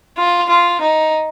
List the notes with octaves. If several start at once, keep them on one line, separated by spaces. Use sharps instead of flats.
F4
F4
D#4